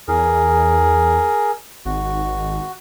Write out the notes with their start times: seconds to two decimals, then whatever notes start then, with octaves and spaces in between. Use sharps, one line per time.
0.08 E2 G#4 A#4
1.85 G#1 F#4